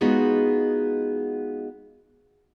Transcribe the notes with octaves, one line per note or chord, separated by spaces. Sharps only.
G#3 B3 D#4 F4 F#4 G#4